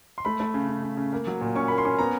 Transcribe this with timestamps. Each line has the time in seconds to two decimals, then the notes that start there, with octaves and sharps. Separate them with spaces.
0.18 C6
0.25 A3 B5
0.40 A3
0.54 C#3
0.69 C#3
0.83 C#3
0.97 C#3
1.13 A#3
1.27 F#3
1.41 A#2
1.55 C#4 C#6
1.68 A#3 B5
1.78 C6
1.85 C#4
1.99 B3 A#5